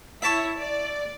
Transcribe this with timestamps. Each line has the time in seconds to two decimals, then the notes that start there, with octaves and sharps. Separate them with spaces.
0.22 E4 C#5 E5 A5 C#6
0.58 D5